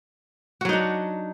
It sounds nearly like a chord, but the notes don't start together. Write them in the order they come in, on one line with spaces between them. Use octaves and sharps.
F#4 F#3 D#4 D4